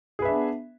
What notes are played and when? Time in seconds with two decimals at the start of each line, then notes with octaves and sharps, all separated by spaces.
0.19 G#4
0.22 B4
0.25 E5
0.28 D4
0.31 B3